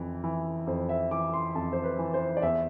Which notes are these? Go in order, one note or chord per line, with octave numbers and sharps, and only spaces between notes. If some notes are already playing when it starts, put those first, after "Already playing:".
Already playing: F2 E3
E3
F2 C5
E5
E3 D6
C6
F2 A5
C5
B4
E3
C5
D5
E2 E5